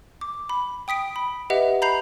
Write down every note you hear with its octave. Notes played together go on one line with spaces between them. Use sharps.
D6
B5
G5 D#6 B6 D7
B5
G4 B4 D#5 E5 F#5
A#5 B5 G6 C7 F7